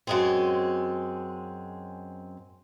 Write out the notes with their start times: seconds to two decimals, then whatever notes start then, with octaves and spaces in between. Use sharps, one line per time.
0.07 F#2 G#3 C4